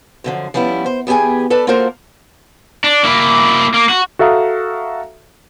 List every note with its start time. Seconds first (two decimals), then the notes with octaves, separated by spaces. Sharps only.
0.24 F#2 D3 F3
0.54 F3 G3 B3 C#4 E4
0.86 C5
1.07 E2 B3 G4 G#4 G#5
1.50 A4 B4 D5 A5
1.67 A#3 F4 F#4 A4 A#4 C5
2.84 D4
3.04 A#3 E4
3.74 A#3
3.89 F#4
4.19 F#4 A4 E5 F5 A#5 D#6